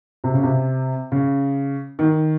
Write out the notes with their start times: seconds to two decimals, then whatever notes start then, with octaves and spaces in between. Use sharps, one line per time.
0.24 C3
0.34 C#3
0.43 C3
1.12 C#3
1.99 D#3